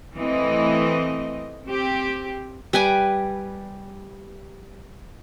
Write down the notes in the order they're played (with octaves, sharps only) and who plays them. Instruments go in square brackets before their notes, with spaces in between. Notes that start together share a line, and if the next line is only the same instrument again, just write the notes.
[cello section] E3 A3 C4 D#5
C4 G4
[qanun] G3 B4 G#5 D6